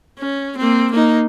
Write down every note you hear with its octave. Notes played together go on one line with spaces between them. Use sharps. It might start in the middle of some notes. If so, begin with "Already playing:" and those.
C#4
A#3 C4
A#3 D#4